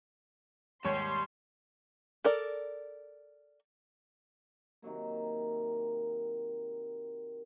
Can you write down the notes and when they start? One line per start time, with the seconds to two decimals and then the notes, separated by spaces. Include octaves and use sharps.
0.85 D#2 G#2 G3 C#5 C6
2.24 A4 A#4 D5
4.82 C3 D#3 F#3 A#3